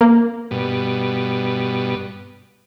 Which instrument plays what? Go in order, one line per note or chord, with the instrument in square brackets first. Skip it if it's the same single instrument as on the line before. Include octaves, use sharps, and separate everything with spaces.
[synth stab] A#3
[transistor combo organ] G2 B2